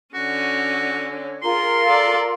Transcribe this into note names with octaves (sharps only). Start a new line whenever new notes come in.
D3 C#4 F#4
C#5
F4 G#4 A#4 A#5 C6
A4 D5